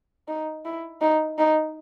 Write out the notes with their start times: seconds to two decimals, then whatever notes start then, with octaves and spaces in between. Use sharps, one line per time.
0.28 D#4
0.65 E4
1.01 D#4
1.38 D#4